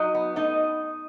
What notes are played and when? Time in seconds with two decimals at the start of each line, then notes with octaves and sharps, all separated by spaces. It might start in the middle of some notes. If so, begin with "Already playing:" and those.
Already playing: F#3 D#4 D#5
0.15 B3
0.36 A3 D#4 D#5